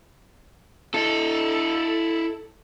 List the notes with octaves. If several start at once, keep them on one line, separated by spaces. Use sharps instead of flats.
E4 A4 D#5